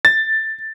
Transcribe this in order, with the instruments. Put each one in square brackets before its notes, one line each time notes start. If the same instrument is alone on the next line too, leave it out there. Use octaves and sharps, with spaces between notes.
[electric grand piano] A6